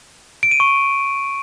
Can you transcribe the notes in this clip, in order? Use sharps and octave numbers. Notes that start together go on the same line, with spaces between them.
D7
D#7
C#6